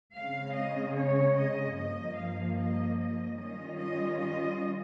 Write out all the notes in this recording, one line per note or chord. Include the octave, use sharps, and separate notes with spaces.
C#3 G#3 C4 F5
D#5
C#5
D#5
G2 F3 A#3 D#5
F5
D#5
D#5
D#3 G3 C#4 F4 D#5
D#5
D#5